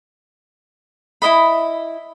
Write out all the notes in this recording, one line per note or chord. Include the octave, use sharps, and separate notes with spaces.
E4 G#4 D#5 B5